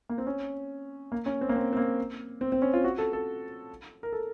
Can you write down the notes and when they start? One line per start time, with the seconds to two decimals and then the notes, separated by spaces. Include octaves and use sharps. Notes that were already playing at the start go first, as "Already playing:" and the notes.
0.09 A#3
0.18 C4
0.27 C#4
1.12 A#3
1.26 C#4
1.41 C4
1.49 A#3
1.56 C4
1.73 C4
1.77 A#3
2.41 C4
2.52 C4
2.62 C#4
2.74 F4
2.84 F#4
2.98 A4
3.13 A4
4.03 A#4
4.13 A4